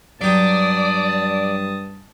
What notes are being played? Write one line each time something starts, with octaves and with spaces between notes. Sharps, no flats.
G2 F#3 G4 D5 A5 D#6